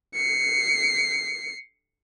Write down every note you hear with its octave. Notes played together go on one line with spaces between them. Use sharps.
C7 C#7